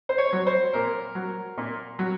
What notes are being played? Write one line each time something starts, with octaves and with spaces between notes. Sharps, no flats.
C5
C#5
F#3
C5
A#2 A#4
F#3
A#2
F#3